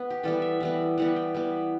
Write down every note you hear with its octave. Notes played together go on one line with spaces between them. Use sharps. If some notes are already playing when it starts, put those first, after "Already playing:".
Already playing: B3
G4
E3 G3 B3 A4
E5
E3 G3 B3
E3 G3 B3 F#5
G5
E3 G3 B3